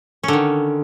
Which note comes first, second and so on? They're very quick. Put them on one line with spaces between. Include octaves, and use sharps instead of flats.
C#4 D3 D#3